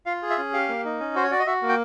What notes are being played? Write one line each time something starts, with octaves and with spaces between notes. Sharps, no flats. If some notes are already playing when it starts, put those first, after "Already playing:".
F4 F5
G#4
E5
C#4
G4 F5
A#3
D#4
C#4
F#4 C5
C#5
F#4 D5
D#5
F#4 E5
A#3
G5